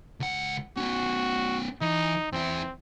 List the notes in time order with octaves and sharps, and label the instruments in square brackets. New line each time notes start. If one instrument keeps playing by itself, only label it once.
[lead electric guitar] C#2 F#5
[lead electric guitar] B3 C#4 [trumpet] F#4
[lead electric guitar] E3 [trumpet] D#4
[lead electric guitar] E2 E4 [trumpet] C4